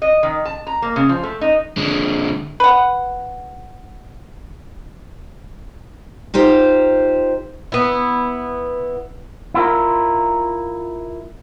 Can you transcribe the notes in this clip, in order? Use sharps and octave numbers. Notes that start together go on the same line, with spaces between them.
D#5
D#3
A5
A#5
A#3
C#3
F3
A3
D#4
D3 G#3
B4 F#5
D#4 F4 G4 C5
B3 E4
E4 F4 A#4